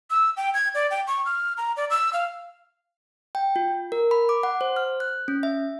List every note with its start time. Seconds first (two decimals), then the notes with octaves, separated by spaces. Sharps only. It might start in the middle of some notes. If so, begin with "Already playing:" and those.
0.10 E6
0.37 G5
0.54 G#6
0.75 D5
0.91 G5
1.07 C#6
1.26 F6
1.57 A#5
1.77 D5
1.90 E6
2.13 F5
3.35 G5
3.56 F4
3.92 A#4
4.11 B5
4.29 D6
4.43 F#5
4.61 C5
4.76 F6
5.00 F#6
5.28 C#4
5.43 E5